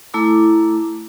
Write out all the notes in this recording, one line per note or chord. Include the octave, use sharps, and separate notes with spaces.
A3 E4 A4 A#5 D6